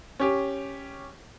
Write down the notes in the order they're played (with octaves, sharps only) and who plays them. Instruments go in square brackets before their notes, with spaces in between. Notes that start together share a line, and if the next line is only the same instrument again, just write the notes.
[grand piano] C#4 G4